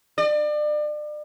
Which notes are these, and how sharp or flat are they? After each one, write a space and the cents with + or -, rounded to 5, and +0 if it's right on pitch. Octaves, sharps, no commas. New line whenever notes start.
D5 +35